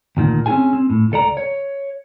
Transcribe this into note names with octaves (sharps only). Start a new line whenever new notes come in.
D2 A#2 D#3
C4 C#4 D#4 F4 G#4 G#5
C4
A2
C#2 A4 D5 A#5
C#5